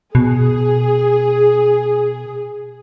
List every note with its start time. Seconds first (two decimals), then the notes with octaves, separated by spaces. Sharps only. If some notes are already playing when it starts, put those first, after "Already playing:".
0.15 B2 G#4